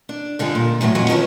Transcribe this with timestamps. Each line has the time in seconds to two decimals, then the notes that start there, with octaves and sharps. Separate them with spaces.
0.09 D4
0.39 G#2 D3 G3 F4 G#4
0.55 A#2
0.81 E2 A2 D3 F#3
0.95 F2 F#3 G#5
1.08 D#3 F3 C#4 B4